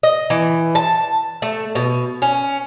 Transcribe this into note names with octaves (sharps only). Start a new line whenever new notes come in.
D#5
E3
A5
A3
B2
C#4